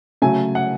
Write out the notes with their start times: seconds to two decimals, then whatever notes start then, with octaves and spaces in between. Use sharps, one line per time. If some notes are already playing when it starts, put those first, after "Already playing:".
0.22 C#3 F#3 A3 G#5
0.55 F#5